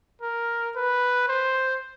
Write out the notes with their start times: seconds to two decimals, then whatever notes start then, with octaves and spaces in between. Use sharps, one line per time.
0.22 A#4
0.76 B4
1.28 C5